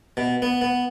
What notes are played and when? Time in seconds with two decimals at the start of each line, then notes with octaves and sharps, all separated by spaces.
0.17 B2
0.42 B3
0.61 B3